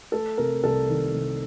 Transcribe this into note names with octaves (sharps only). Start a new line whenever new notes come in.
A3 A4
C3 A#4
C2 A4
D#3
C2